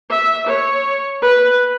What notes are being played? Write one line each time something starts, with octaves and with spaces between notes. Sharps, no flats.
E5
C#5
B4